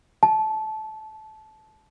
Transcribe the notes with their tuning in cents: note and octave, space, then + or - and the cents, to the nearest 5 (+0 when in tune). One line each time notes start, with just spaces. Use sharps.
A5 -20